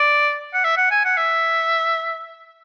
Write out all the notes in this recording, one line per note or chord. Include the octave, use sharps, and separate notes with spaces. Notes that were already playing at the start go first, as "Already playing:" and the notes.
Already playing: D5
F#5
E5
F#5
G#5
F#5
E5